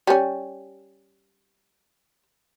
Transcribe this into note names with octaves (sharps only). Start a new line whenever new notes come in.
G3 C#4